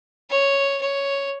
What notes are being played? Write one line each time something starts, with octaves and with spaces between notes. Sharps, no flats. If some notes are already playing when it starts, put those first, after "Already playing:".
C#5
C#5